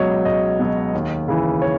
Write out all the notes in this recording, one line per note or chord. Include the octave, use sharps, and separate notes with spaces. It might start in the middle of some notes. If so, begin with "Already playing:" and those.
Already playing: C#2 B2 F#3 C#5 D#5
C#2 D#5
B2 F#3
D#2
C#3 E3
C#5